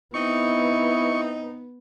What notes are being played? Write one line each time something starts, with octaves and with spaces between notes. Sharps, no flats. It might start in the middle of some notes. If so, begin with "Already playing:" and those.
B3 C4 D#4 E4 C#6